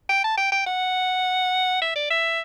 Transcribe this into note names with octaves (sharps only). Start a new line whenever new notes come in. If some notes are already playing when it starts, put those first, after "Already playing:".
G5
A5
G5
G5
F#5
E5
D5
E5